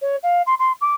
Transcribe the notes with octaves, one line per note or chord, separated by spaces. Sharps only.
C#5
F5
C6
C6
D6